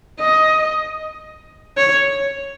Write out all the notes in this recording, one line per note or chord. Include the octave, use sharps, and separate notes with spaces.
D#5
C#5